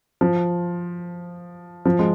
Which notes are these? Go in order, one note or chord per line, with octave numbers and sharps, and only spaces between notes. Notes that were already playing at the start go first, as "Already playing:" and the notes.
F3
F3
G#3